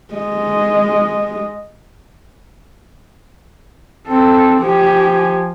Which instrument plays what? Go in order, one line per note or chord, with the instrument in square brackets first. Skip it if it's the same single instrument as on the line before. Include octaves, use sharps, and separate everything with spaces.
[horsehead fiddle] G#3 D#5
[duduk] C4 [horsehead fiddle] A4
[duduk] F3 [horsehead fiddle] G4 G#5